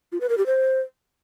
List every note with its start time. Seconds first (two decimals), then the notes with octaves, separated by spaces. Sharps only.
0.12 F4
0.21 B4
0.29 A#4
0.38 G4
0.46 C5